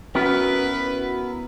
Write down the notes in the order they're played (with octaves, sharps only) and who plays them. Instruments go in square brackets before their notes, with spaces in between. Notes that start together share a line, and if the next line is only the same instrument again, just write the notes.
[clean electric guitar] B3 E4 A#4 [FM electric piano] C#4 F#4 [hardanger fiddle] B4